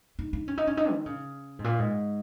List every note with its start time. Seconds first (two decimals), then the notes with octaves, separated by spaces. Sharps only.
0.19 D#4
0.33 D#4
0.48 C#4
0.58 D#4
0.67 C#4
0.77 D#4
0.92 D#3
1.06 C#3
1.59 G#2
1.64 A#2
1.79 G#2